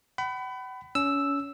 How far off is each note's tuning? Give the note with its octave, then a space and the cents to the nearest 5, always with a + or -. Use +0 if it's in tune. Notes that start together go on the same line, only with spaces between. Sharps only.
F#5 +45 B5 +20
C#4 +30 E6 +0